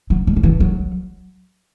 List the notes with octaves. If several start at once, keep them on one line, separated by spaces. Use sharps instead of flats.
F#3
G3
F#3
E3
F#3